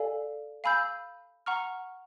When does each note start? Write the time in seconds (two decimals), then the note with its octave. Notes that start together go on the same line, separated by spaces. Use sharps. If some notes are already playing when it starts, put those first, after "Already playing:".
Already playing: A4 D5 F5 G#5
0.64 F5 G#5 B5 E6 G6
1.46 F#5 A#5 C#6 F6